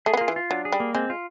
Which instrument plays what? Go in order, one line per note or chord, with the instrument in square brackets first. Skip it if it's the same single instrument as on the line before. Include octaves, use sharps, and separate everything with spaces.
[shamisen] A3 [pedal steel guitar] G#4
[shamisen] B3
[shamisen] A#3 [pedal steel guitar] F4
[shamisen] E3
[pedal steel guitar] F4
[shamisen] F#3 [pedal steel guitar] D4
[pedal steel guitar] G#4
[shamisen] G3
[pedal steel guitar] A#3
[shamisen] G#3 [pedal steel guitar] C4
[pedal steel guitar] F4